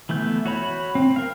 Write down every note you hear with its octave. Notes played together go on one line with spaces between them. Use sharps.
E3 A3 B3 G6
F#4 C#5 B5
C4
A#4 F5